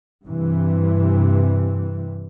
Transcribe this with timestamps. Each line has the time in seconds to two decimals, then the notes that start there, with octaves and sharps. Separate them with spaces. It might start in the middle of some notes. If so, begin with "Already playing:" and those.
0.25 G2 C3 E3